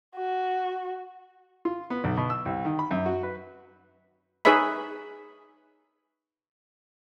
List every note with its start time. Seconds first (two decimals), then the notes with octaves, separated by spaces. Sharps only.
0.15 F#4
1.65 F4
1.90 B3
2.04 B1
2.17 B2
2.30 E6
2.45 C2
2.65 D#3
2.79 B5
2.91 F#2
3.06 F#4
3.23 B4
4.45 D#4 G#4 B4 C#5 E5 B5